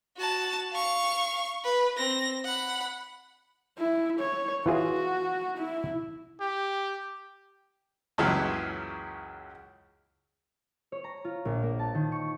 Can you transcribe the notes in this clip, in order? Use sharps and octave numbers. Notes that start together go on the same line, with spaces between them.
F#4 A5
F5 C#6
B4
C4 A#6
F#5 B5
E4
C#5
E3 F4 F#4 G#4
E4
G4
C#2 F#2 A#2 C#3 E3
C#5
A#5
F4
A#1
A#3
A5
D#3
C#6